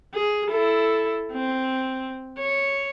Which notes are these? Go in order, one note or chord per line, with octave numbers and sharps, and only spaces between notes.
G#4
E4 A4
C4
C#5